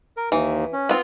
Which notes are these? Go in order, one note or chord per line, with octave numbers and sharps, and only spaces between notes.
A#4
D#2 E3
C#4
B3 C4 F4